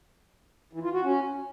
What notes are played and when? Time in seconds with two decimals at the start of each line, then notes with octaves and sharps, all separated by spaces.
0.73 E3
0.83 F4
0.93 F#4
1.03 C#4